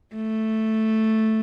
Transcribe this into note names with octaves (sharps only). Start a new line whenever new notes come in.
A3